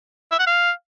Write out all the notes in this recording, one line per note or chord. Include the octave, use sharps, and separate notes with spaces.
E5
F#5
F5